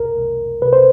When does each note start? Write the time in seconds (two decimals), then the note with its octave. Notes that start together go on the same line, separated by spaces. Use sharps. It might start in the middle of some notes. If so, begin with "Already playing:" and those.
Already playing: C2 A#4
0.18 C2
0.62 C3 B4
0.73 C5